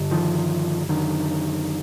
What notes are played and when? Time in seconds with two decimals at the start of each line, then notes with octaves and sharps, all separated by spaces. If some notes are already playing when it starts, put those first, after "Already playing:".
Already playing: G2 D3
0.11 D#3 F3
0.89 F#2 D3 D#3